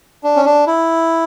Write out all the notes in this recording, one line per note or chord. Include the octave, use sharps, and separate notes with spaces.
D4
C#4
D4
E4